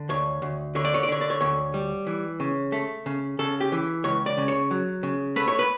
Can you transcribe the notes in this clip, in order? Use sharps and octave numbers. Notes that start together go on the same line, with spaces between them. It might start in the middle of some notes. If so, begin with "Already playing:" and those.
Already playing: D3
D2 C#5
D2
D3 C#5
D5
C#5
D5
D3 C#5
D5
C#5
D2 C#5
G3
E3
C#3
A3
C#3
C#3 A4
G4
E3
C#2 C#5
D5
C#3
C#5
F#3
C#3
A3 B4
C#5
B4